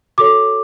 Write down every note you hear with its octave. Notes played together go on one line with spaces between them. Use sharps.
F#4 A4 C#5 D6